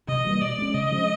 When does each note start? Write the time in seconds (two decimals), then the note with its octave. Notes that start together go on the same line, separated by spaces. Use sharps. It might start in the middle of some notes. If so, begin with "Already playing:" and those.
0.08 C3 D#5
0.25 E3 G3 A#3
0.41 B2 D5
0.58 G#3 C#4
0.74 C#3 D#5
0.91 F3 G#3 C#4